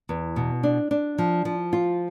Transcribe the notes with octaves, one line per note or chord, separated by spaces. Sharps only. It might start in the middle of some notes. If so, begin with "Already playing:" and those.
E2
B2
D4
D4
F3
F3
F4